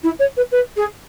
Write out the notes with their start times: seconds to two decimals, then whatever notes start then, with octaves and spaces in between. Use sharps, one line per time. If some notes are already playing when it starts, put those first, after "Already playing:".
0.03 E4
0.19 C#5
0.37 B4
0.52 B4
0.77 G#4